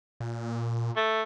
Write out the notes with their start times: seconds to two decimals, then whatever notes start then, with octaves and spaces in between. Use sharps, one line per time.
0.20 A#2
0.96 A3